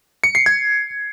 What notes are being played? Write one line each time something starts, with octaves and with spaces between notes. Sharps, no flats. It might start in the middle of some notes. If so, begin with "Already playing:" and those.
C#7
C7
G#6